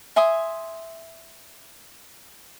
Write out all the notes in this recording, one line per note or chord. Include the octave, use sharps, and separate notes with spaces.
E5 G#5 C6 D#6